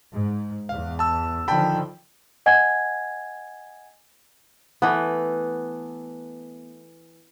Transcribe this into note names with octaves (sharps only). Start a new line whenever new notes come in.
G#2
E2 F5
A5 E6
D3 D#3 F3 G5 A5 B5
D#5 F#5 G#5 G#6
E3 A3 B3